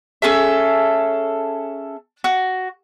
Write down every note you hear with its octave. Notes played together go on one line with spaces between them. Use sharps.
C#4 G#4 A4 E5
F#4